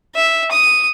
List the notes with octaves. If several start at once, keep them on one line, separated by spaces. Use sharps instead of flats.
E5
D#6